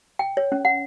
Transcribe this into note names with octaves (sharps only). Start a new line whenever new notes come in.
G5
C#5
C#4
F#5